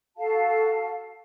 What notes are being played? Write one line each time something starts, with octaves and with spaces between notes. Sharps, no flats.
F#4 A4 F5 A5